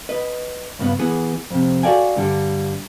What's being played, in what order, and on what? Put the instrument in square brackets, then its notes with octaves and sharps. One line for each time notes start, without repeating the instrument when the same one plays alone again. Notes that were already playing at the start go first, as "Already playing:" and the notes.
[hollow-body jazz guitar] B4 D#5
C#2 G2 B3
E3 B3 G#4
F2 C3
F#4 A4 D5 F5 G5 G#5
G2 D3 G3